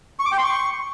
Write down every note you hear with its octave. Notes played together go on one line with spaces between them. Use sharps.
C#6
D6
G5
C6
C#6